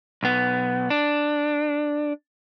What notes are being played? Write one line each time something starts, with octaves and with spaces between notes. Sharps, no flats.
B1 B3
D4